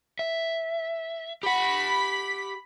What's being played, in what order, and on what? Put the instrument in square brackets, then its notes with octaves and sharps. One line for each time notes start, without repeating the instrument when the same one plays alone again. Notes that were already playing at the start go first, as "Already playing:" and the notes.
[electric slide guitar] E5
[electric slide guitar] G4 F#5 [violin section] B5 B6